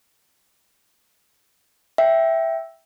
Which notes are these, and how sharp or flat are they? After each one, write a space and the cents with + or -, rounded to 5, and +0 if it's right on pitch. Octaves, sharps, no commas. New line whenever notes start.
E5 +0 G5 +0